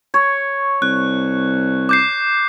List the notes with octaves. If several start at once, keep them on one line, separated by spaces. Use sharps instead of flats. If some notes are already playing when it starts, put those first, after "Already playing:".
C#5
C2 F#6
D6 G6 C7